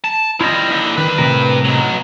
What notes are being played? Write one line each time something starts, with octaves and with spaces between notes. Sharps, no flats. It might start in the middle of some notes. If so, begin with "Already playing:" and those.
A5
G3 E4 F4 D#5
D#2 D3
D#3 G3 B4
A2 C3 A#4
B2 F#3